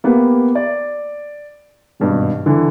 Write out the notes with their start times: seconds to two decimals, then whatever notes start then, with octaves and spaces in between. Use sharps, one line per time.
0.04 A#3 B3 G4
0.55 D5
2.00 G#1 G2 B2
2.46 D3 E3